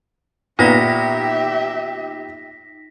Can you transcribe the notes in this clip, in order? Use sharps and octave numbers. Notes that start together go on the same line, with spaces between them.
A#2 B3 D#4 G4 E5 A#6 B6